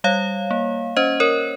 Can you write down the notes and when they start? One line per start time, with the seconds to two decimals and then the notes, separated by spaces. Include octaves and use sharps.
0.04 G3 C#5 F5
0.51 A#3
0.97 C#4 C5 D#5
1.20 A#4 C#5